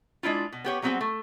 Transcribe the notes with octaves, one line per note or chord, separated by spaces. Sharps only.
G#3 D4 E4 F4
B2
B3 G4 C#5
F#3 G3 B3 C4 F#4 G#4
A3